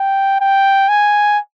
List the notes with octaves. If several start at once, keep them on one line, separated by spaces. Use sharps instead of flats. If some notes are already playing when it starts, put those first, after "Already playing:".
Already playing: G5
G5
G#5